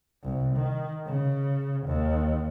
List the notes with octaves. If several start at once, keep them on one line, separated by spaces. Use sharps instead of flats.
C2
D#3
C#3
D#2